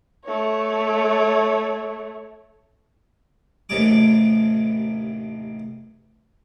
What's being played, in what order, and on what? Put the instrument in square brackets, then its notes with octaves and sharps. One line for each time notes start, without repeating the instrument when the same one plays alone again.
[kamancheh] A3 C#5
[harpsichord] A1 D#2 A2 C3 G#4 D6